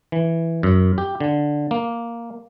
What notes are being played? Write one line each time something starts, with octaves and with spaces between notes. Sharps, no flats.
E3
F#2
G4
D3
A#3